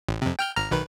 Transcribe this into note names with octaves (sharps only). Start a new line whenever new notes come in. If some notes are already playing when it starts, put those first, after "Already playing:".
A1
F2 C3
G5 F6 G6
G#1 A#5 F6
B1 D#3 B4